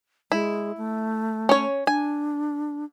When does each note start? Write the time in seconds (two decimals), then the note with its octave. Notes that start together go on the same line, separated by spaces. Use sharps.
0.32 G#3 E4
0.77 A3
1.49 C#4 C#5
1.87 D4 G#5